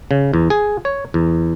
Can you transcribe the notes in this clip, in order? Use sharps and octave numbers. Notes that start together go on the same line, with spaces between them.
C#3
E2
G#4
C#5
E2